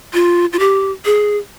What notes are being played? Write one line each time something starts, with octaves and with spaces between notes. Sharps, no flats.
F4
F4
G4
G#4